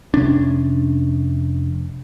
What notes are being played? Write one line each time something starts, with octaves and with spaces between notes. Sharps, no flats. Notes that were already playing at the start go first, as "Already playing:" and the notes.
F1 C3 C#4 D4